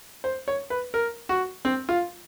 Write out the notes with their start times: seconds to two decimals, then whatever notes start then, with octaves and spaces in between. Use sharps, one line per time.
0.24 C5
0.48 C#5
0.70 B4
0.94 A#4
1.29 F#4
1.65 C4
1.89 F4